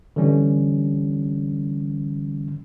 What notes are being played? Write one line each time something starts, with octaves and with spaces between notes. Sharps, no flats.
D3 E3 G3 C#4